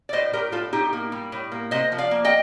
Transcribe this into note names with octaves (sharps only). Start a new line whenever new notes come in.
D5
A2 C5 D#5
A2 G4 A#4
A2 F4 A4
A2 D#4 G4
A#3
G3
A2
A#3
C3 C5 D#5
F3
D5 F5
A#3
D#5 G5